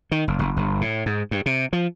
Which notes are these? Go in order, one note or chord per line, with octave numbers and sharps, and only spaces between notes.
D#3
F#1
F#1
G1
A2
G#2
G2
C3
F3